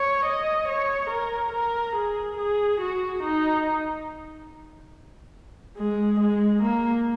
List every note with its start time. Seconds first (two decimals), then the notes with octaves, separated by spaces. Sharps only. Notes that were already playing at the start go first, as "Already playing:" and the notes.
Already playing: C#5
0.26 D#5
0.68 C#5
1.10 A#4
1.53 A#4
1.96 G#4
2.37 G#4
2.81 F#4
3.23 D#4
5.77 G#3
6.20 G#3
6.63 A#3